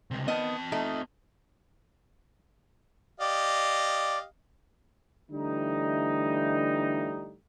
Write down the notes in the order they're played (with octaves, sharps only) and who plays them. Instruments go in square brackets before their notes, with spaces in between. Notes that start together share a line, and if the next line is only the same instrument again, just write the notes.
[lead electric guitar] C#2 C3
[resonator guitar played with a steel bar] D#3 B3 D#5 [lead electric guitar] C4 A5
[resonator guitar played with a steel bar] A3 D#4
[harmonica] G4 D#5 F5 [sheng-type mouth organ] D5
[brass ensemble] D3 E3 G3 A3 D#4